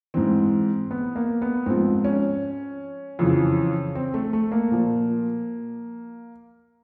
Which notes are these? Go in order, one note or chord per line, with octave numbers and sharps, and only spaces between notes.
G#2 E3 C4
B3
A#3
B3
G#2 F3 C4
C#4
F2 C#3 E3
C4
A3
A3
A#3
A#2 F3